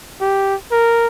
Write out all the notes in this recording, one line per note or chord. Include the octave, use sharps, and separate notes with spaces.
G4
A#4